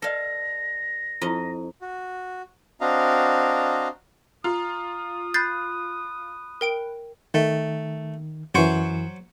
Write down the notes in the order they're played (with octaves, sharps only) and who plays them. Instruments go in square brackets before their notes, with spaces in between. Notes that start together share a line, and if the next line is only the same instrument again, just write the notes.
[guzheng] A4 F5 [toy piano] B4 D5 D#5 [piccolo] A#6
[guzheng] F2 D#5 [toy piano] E4 F4
[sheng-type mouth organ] F#4
C4 D4 F#4 D#5 F5 A#5
[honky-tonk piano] F4 [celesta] A#5 [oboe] D#6
[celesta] B5 F#6 [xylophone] G6 A6 C7
[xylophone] A#4 G5 D7
[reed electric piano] D#3 [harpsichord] A3
[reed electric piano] F#2 E3 [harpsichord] F#3 C5 C#6